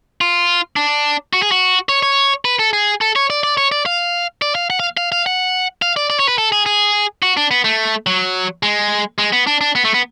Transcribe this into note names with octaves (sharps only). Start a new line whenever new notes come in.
F4
D4
F#4
G#4
F#4
C#5
C#5
B4
A4
G#4
A4
C#5
D5
D5
C#5
D5
F5
D5
F5
F#5
F5
F5
F5
F#5
F5
D5
D5
C#5
B4
A4
G#4
G#4
F#4
D4
B3
A3
F#3
G#3
G#3
B3
D4
D4
B3
A3
B3